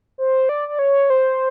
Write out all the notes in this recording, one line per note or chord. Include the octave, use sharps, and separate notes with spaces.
C5
D5
D5
C#5
C5